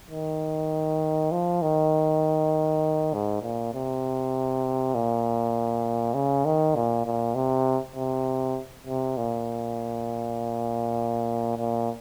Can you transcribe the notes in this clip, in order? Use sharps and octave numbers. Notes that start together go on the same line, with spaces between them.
D#3
F3
D#3
G#2
A#2
C3
A#2
C#3
D#3
A#2
A#2
C3
C3
C3
A#2
A#2